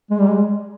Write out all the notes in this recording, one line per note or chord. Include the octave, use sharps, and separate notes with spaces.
G#3
G3
G#3